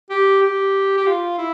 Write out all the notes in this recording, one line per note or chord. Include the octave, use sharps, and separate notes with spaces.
G4
G4
G4
F4
E4